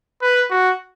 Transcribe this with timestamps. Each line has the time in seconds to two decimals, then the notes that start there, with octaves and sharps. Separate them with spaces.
0.22 B4
0.50 F#4